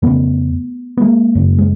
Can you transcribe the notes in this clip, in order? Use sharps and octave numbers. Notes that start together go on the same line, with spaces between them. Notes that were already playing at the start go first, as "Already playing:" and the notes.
F2 C#3 A3 B3
B3
G#3 A#3
F#2 C#3
G#3